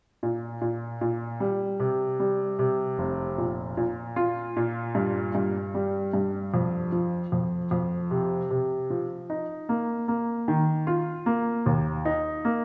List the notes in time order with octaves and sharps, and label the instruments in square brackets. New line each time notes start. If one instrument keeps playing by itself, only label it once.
[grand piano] A#2
A#2
A#2
G3
C3
G3
C3
F1
A#2
A#2
F4
A#2
G2
G2
G3
G2
F2
F3
F2
F2
C3
C3
F3
D#4
A#3
A#3
D#3
F4
A#3
D#2
D#4
A#3